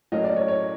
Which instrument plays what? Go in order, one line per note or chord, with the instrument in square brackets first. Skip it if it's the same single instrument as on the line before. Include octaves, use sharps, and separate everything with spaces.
[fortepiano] A2 F#3 A#3 C#4 [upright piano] D#5
[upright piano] D5
C#5
C#5